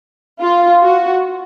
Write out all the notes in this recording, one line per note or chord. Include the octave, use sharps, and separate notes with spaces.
F4
F#4